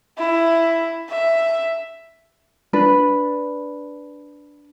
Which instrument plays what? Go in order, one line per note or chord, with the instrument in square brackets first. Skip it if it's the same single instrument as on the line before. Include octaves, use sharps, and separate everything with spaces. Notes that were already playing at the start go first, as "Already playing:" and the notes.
[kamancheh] E4
E5
[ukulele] D4 B4